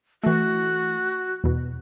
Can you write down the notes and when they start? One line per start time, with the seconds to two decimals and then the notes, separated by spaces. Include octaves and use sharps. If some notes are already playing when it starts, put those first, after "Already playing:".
0.23 E3 A3 F#4
1.44 E2 B2